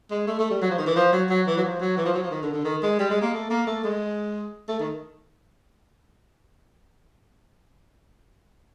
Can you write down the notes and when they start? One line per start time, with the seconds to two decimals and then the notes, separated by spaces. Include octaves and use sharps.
0.11 G#3
0.27 A3
0.39 A3
0.50 G3
0.62 F#3
0.70 F3
0.78 D#3
0.87 E3
0.96 F3
1.12 F#3
1.30 F#3
1.47 E3
1.58 F#3
1.64 F3
1.80 F#3
1.97 E3
2.06 F3
2.14 F#3
2.23 F3
2.31 D#3
2.43 D3
2.53 D3
2.65 D#3
2.83 G#3
2.99 G3
3.10 G#3
3.22 A#3
3.33 A3
3.50 A#3
3.67 A3
3.84 G#3
4.68 A3
4.80 D#3